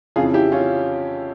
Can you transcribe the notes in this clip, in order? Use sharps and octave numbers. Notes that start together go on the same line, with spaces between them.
F2 C#3 E3 F4 G#4
E4 G4
C#4 F4